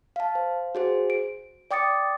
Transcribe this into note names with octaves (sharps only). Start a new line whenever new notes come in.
F5 A5
C5
F#4 G#4 C5
D7
D5 G5 D6 D#6 A6 C#7